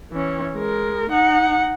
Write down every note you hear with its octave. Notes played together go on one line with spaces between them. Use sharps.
E3 C#4
G#3 A#4
D#4 F#5